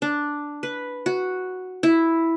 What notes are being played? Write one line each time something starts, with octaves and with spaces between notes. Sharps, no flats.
D4
B4
F#4
E4